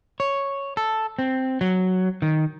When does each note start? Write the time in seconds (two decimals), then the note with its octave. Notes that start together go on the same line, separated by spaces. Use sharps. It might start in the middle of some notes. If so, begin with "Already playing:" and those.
0.20 C#5
0.77 A4
1.19 C4
1.61 F#3
2.22 D#3